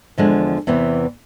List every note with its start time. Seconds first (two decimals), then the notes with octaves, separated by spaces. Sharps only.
0.18 E2 D3 F3 G#3
0.67 E2 C3 E3 B3